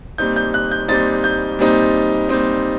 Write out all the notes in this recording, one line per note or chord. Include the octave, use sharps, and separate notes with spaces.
A#2 G3 C4 D#4 G6
G6
F#6
G6
A#2 G3 C4 D#4 A6
G6
A#2 G3 C4 D#4
A#2 G3 C4 D#4